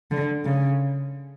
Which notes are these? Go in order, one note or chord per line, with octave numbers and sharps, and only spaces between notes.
D3
C#3